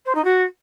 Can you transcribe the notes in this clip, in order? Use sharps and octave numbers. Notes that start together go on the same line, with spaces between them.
C5
D#4
F#4